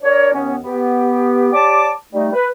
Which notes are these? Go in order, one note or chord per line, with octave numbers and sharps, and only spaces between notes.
D4 A#4 C#5
D#2 B3 C#4
B3 G4
G4 C#5 D5 A5 D6
G3 A3 D#4
B4